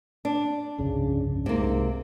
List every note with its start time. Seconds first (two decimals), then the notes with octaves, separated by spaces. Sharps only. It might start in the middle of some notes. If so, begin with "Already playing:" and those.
0.25 D4
0.79 G1 C2 F2 C#3
1.46 C2 G#2 C3 A#3 C4